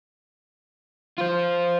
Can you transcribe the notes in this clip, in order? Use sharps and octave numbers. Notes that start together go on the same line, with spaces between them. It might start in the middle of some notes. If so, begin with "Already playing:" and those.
F4 C5